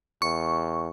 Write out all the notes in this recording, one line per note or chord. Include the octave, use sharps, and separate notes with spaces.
E2 C#6